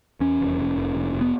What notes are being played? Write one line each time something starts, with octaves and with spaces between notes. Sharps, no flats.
E2 C#4
F1
F1
F1
F1
F1
B3